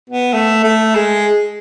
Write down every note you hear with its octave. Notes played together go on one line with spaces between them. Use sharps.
B3
A3
A3
G#3